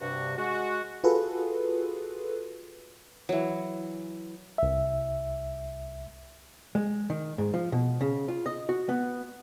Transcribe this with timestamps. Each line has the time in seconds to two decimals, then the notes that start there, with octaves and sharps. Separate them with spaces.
0.01 G2 C3 F#4
0.37 G#3 F#4
1.04 F4 F#4 G#4 A4 B4
3.29 E3 F#3
4.58 C2 E5
6.75 G#3
7.10 D#3
7.38 G#2
7.54 F3
7.72 B2
8.01 C#3
8.28 F4
8.46 D#5
8.69 F#4
8.89 B3